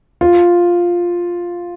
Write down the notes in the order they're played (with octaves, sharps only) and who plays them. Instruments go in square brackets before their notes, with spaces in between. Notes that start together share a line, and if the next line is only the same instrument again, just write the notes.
[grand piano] F4